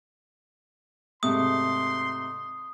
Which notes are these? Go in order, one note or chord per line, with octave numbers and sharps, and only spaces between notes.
G#2 C3 A3 C6 D#6